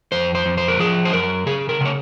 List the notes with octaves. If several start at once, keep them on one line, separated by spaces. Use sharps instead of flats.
F2 C5
C5
F2
C5
A#4
F3 G#4
C5
F#2 A#4
C#3 G#4
A#4
C#3 C#5